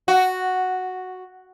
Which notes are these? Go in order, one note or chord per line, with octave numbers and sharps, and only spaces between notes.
F#4